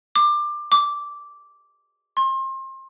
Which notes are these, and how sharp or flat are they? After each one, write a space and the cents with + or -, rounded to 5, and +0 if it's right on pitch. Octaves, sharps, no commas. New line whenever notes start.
D6 +20
D6 -10
C6 +30